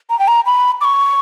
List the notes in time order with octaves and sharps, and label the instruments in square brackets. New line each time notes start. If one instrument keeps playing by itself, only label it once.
[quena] A#5
G5
A#5
B5
D6
C#6